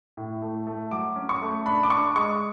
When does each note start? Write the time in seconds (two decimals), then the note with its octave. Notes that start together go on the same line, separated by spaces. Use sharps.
0.17 A2
0.42 A3
0.67 A3
0.91 F#3 D6
1.16 C#4
1.29 C#6
1.42 A3
1.66 D4 B5
1.83 D6
1.90 D4 C#6
2.16 G#3 C#6